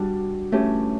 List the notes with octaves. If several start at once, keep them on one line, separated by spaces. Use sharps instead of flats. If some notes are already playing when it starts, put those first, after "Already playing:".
Already playing: G3 D4 F#4
E3 A3 C#4 G4